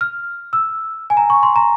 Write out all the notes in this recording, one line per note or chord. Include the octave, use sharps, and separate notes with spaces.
F6
E6
G#5
A#5
C#6
C6
A#5